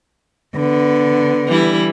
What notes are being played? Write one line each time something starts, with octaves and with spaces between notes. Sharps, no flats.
D3 B3
E3 G3 E4